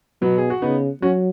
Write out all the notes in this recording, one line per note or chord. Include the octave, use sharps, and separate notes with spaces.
B2 F#3 B3
G#4
F#4
C#3 B3 D#4
F#3 C#4 F#4